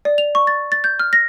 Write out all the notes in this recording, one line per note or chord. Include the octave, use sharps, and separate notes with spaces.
D5
F7
C#6
A6
A6
G6
F6
A#6